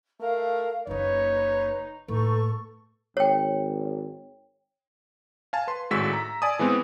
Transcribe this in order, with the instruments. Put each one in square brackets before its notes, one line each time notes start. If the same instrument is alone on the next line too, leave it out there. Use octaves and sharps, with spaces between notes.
[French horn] A3 [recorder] A#4 [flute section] F5
[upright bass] F#1 A#3 [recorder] D#4 [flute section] B4 [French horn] C#5
[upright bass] A2 A#3 [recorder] D#4 [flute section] A4 C#6 [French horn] B4
[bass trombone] G#1 [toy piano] C#5 G5
[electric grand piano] F5 G#5 A5
B4 C6
G#1 A2 G#3 F#4 E6 B6
A#5
D5 G#5 A5 D#6
E3 G#3 B3 C4